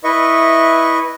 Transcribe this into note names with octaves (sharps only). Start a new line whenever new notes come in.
E4 B4 D#5 E5 C#6